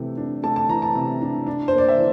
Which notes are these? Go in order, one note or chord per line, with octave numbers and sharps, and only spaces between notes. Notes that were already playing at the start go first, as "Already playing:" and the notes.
Already playing: C3 E3 A3
D4
A3 A5
A5
E3 A#5
A5
C3
D4
D4
C5
A#3
D5
E5
E3